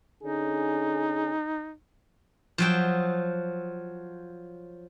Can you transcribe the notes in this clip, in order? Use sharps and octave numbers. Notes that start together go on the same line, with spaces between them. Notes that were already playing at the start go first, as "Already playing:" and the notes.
D3 C#4 D#4 G#4
F3 F#3 G5